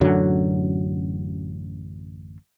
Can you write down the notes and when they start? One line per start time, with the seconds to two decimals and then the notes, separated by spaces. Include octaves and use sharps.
0.01 A1 F#2 D3 F#3